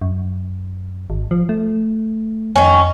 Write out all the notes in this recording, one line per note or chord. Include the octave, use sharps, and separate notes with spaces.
F#2
G#1
F3
A3
F2 D#3 C#4